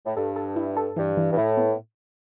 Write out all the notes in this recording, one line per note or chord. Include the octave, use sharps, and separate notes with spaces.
A2
G2 A4
A4
E4
A4
G2 E3
E3
G2
A2 E4
B3